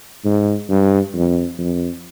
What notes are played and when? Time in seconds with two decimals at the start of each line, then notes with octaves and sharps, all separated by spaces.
0.24 G#2
0.69 G2
1.14 F2
1.58 F2